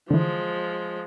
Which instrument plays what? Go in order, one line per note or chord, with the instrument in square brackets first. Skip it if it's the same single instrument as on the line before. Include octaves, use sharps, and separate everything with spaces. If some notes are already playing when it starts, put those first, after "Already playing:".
[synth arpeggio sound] D3 E3 [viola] F3 G#3